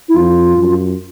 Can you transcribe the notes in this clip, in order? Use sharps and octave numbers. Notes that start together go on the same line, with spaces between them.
E4
F2 F4
F#2